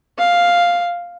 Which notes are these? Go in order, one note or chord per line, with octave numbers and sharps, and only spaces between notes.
F5